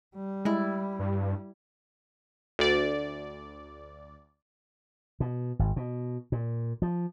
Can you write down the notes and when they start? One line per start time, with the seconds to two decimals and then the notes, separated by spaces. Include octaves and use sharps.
0.16 G3
0.45 G#3 E4 D5
0.99 G2
2.59 D2 D5
5.20 B2
5.59 G#1
5.76 B2
6.32 A#2
6.82 F3